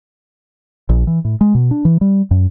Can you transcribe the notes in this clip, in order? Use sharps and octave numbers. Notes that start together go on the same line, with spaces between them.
A#1
E3
A2
G#3
B2
D4
E3
G3
F#2